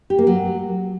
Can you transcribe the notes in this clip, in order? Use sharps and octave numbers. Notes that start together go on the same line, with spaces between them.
G4
A#3
F#3